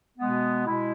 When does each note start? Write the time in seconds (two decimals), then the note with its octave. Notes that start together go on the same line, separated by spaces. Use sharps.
0.19 B2 G#3 B3
0.65 B2 G#3 E4